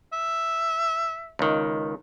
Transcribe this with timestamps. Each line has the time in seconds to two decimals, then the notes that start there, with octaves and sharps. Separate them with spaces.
0.13 E5
1.39 C#2 D#3